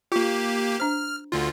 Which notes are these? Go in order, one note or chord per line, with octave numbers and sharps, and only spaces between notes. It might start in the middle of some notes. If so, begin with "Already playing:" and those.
A#3 F4 G4
D4 C5 F6
D2 D3 F4